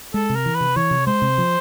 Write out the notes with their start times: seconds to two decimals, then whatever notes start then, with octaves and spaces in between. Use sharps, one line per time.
0.14 G#3 A4
0.30 C3
0.35 A#4
0.46 E3
0.55 B4
0.61 C3
0.76 E3 C#5
0.91 C3
1.06 G#3 C5
1.22 C3
1.38 F3